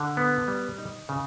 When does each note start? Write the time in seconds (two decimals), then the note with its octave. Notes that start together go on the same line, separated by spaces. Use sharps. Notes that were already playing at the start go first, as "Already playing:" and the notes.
Already playing: D3
0.17 B3
0.48 G3
0.78 D#4
1.09 C#3